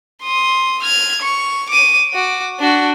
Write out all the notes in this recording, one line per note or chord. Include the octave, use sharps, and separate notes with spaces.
C6 D#6
F6 G#6
C#6
D6 D#7
F#4 D6
D4 F#4